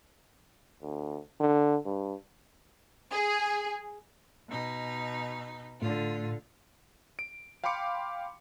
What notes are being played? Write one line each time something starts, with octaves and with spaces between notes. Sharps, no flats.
D2
D3
G2
G#4
B2 D#4
A2 D3 A3 F4
D7
F5 G5 B5 C6 D6 C#7